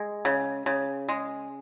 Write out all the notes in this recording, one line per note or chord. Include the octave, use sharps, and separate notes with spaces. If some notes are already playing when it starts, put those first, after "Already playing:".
Already playing: G#3
C#3
C#3
G#3